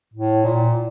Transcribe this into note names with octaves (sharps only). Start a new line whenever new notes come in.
A2
A#2